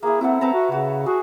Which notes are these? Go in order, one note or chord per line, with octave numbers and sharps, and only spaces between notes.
A#3 E4 G#4
C4 E4 A4 F#5
C4 B4 A5 A#5
F#4
C#3 F#4
F#4 G#4